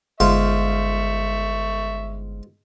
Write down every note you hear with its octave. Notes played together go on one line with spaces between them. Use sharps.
G1 G#2 F4 E5 C6 C#6